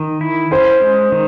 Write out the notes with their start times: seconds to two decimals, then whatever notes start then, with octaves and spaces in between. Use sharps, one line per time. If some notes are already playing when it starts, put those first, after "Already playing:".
Already playing: D#3
0.21 E4
0.51 C#4 C5
0.81 G#3
1.12 D#3